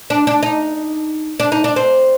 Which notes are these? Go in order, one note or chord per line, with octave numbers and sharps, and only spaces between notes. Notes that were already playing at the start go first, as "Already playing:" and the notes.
D4
D4
D#4
D4
D#4
D4
C4